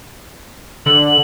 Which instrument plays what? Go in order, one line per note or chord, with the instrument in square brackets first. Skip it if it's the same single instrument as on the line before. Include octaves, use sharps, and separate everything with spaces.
[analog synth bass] D3 [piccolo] F#7